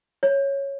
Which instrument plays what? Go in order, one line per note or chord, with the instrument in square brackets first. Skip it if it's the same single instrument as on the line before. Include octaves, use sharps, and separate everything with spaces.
[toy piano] C#5